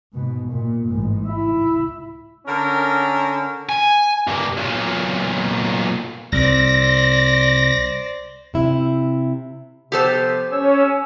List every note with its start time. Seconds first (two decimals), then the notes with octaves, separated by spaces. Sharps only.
0.13 G#2 B2
0.52 A#2
0.88 A1 G#2
1.27 E4
2.46 D3 C#4 A#4
3.69 G#5
4.27 G2 A#3
4.57 B1 A#2
6.32 C2 C5 D5 A#6
8.54 C3 E4
9.92 C3 F3 B3 G4 A4 C5
10.52 C#4 C#5 E6